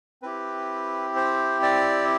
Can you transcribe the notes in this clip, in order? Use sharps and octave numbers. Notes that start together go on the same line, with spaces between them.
C4 E4 G4 B4
C5
D5